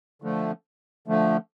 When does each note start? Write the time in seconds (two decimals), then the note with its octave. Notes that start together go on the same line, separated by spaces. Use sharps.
0.22 D3 F3 A3
1.07 D3 F3 A3